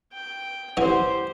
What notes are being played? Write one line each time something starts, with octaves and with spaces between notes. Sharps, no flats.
G5
D3 E3 C#4 G4 C5